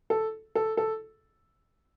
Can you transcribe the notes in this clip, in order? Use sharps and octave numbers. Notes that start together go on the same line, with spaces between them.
A4
A4
A4